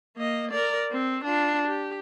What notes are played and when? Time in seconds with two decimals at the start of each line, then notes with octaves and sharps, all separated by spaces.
0.17 A#3 D#5
0.51 A#4 D5
0.92 C4
1.24 D4 F4
1.67 G4